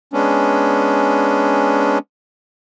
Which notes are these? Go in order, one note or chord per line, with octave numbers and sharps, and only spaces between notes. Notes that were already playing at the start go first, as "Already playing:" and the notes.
G#3 B3 C#4 D4